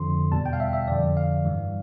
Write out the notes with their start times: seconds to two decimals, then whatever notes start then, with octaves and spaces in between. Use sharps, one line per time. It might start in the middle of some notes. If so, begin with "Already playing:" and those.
Already playing: F2 D3 F3 C6
0.32 E2 B2 G3 A5
0.46 G5
0.53 F5
0.60 E5
0.73 E5
0.88 F2 D3 F3 D5
1.17 F5
1.44 G2 E3 G3